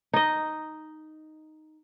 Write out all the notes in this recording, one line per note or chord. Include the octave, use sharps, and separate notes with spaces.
D#4 D#5